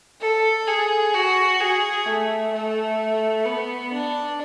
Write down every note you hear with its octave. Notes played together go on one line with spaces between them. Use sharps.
A4
G#4
F#4
G#4
A3
A3
B3
D4